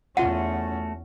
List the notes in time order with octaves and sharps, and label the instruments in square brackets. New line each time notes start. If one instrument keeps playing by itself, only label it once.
[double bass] E2 C#4 [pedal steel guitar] A3 F#4 [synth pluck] F4 C6 D#7 [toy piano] F#5